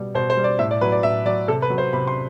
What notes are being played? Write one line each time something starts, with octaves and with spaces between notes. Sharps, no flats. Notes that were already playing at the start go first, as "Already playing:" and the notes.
Already playing: B2 G3
B2 C5
C5
G3
D5
A2 E5
D5
F#3 B4
D5
A2 E5
F#3 D5
C3 A4
B4
F#3
C5
C3 B5
C6